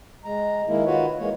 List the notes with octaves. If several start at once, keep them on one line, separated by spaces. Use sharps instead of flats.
G#3 A#5
D#3 G#3 A#3 E4
D#3 F4 F#4 B4 C#5
E3 G#3 A#3 C#5